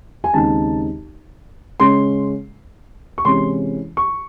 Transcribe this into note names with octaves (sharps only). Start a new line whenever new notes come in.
G#5
D#2 C#3 G#3 C4 D#4 A5
C#3 G#3 C#4 C6
C#6
C3 E3 G#3 C#4 E4 C6
C#6